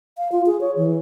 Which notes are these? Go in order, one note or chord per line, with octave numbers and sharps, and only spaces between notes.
F5
F4
G#4
C#5
E3